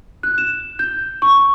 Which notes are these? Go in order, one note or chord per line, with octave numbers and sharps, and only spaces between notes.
F#6
E7
G6
C#6